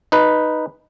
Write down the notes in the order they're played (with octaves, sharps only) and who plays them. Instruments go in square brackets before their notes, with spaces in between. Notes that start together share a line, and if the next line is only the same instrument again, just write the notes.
[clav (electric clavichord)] D#4 B4